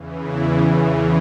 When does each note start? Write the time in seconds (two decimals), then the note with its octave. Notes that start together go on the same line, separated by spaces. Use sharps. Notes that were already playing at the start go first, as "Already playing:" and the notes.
Already playing: E2 C#3 E3
0.22 E4